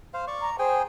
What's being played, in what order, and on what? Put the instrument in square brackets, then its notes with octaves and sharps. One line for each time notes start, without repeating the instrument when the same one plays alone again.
[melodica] C5 F5
D5 C#6
[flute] A#5
[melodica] G#4 G5 G#5 [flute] C5